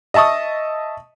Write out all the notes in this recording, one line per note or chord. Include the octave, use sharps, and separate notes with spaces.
D#5 E5 A5 C#6 D#6